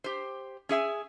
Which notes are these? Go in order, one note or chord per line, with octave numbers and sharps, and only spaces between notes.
G4 C5
C#4 G#4 E5 G#5